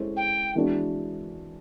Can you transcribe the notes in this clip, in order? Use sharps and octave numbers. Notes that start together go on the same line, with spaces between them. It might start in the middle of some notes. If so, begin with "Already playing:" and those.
Already playing: G#3 C#4 E4 A4 C5
G5
E3 G#3 B3 D4 F#4